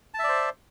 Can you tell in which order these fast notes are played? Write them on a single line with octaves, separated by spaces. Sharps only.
A5 E5 D5 C5